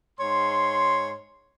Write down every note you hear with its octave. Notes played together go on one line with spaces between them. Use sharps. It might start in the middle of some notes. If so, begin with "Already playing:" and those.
G#2 C#5 C6